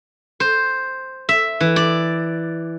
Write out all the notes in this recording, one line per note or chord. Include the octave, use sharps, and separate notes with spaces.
C5
E5
E3
D5